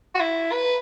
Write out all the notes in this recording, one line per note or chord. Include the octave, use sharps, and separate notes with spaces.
F#4
E4
B4